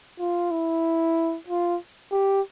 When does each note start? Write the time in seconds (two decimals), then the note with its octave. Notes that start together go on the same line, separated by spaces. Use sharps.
0.20 F4
0.51 E4
1.48 F4
2.12 G4